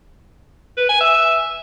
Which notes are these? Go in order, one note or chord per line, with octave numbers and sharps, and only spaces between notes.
B4
G#5
E5